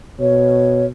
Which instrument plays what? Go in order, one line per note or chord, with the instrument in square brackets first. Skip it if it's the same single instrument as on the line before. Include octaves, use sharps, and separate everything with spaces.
[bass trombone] B2 [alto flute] C#5